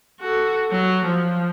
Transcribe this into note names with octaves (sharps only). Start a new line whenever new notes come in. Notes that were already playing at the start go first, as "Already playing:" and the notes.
F#4 A4
F#3
F3